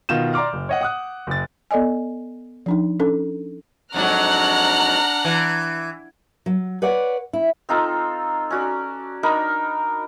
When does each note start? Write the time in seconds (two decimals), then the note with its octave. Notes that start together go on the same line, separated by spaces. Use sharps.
0.09 B2 D#3 F4 G6 E7
0.34 D5 A#5 C6 D6 F6
0.53 F#1
0.69 C#5 D#5 F#5
0.81 F#5 D#6 F#6
1.27 F#1 A6
1.71 B3 A4 D5 D#5 G#5
2.66 F3 D4 D#4
3.00 C#4 D4 A4
3.94 F2 G#2 F#3 D4 F#5 A#5 F6 F#6
5.25 E3
6.46 F#3
6.82 B4 C#5 D5 F#5
7.33 E4
7.69 C4 D#4 F4 A4
8.50 C#4 F#4 D5
9.23 D4 D#4 A#4 B5